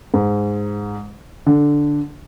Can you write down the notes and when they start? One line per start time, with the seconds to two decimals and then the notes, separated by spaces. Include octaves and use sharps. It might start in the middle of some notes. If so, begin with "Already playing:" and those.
0.14 G#2
1.46 D3